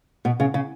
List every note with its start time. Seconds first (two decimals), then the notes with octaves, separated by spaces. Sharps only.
0.25 B2
0.40 C#3
0.54 C#3